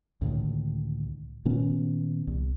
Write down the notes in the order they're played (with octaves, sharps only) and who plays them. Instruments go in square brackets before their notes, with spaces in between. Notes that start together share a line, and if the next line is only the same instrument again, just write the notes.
[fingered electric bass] C#2 A2 D3 D#3
A#2 D#3 B3 C#4
C2